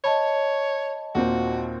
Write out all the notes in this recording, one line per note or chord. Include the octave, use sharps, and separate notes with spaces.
C#5 D#5 A5 B5
D#2 A#2 C4 F#4